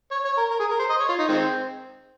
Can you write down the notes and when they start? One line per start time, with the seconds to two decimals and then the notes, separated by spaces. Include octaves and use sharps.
0.11 C#5
0.25 C#5
0.38 A#4
0.51 A#4
0.60 G#4
0.70 A#4
0.79 C5
0.90 D#5
1.00 C#5
1.09 F4
1.19 D#4
1.28 D#3 G#3 C4